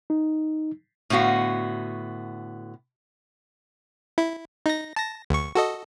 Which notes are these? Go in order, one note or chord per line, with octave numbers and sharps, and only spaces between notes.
D#4
A2 D3 B3 F#4 F5
E4
D#4 A#6
A5 A#6
D2 C#6
F#4 A4 D#5